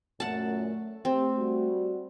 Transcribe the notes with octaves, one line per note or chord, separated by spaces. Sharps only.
F#2 A#2 A3 F#5 A5
C4 G4
G3 F#4